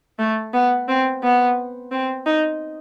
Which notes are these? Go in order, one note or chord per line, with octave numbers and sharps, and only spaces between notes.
A3
B3
C4
B3
C4
D#4